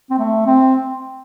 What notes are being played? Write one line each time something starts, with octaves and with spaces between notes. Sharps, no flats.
C4
A3
C4